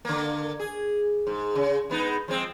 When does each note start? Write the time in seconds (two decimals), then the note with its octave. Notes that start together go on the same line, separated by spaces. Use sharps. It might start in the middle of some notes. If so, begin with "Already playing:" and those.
0.05 D3 A#3
0.60 G#4
1.27 G#2
1.55 C#3
1.90 G#3 B3 D#4
2.28 F3 G#3 C4